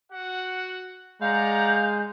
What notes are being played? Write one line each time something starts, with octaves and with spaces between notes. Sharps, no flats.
F#4 F#5
G#3 D5 F5 F#5 A#5 G6